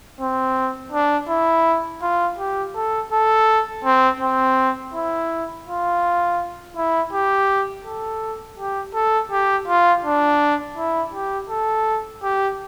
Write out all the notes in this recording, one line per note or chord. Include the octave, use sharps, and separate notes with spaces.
C4
D4
E4
F4
G4
A4
A4
C4
C4
E4
F4
E4
G4
A4
G4
A4
G4
F4
D4
E4
G4
A4
G4